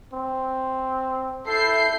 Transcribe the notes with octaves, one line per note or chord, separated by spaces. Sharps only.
C4
E4 A4 G6 C7